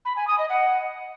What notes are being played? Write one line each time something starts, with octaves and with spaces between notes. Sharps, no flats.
B5
G#5
D#6
D#5
F#5